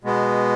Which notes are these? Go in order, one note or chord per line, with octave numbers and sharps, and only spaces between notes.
B2 G#3 B3